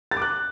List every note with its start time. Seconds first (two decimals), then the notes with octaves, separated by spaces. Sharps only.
0.11 A6
0.17 D6
0.22 F#6